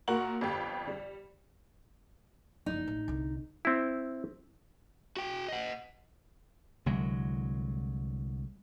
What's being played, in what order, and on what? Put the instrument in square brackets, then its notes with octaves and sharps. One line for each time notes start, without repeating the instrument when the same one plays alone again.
[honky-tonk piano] A#2 F#4 A#4 F#7
G1 F2 G4
G3
[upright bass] F#1 F3 [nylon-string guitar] D#4
[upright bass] A1
C2 D3
[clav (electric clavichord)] C4 E4
[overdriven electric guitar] F#4 G5
D#5 F#5
[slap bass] C2 D3 F#3 G#3